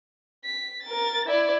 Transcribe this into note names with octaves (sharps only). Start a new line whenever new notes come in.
B6
A#4 A6
E4 D5